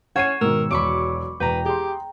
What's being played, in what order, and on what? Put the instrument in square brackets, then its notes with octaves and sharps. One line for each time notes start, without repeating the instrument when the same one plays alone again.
[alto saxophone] C#4 [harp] C#5 G#6 E7 [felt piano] F#5 C7 D#7
[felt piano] G#2 B2 D#3 [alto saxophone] A#4 [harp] E6
[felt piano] E1 D7 [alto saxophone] F#3 [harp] B5 C#6 D6
[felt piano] E1 [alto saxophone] B4 [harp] G5 A#5
[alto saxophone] G4 [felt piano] G#4 C6